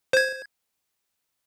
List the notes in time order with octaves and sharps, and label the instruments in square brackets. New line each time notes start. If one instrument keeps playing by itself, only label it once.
[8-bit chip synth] C5 G#6